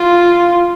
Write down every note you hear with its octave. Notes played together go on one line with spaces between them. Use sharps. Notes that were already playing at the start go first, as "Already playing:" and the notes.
Already playing: F4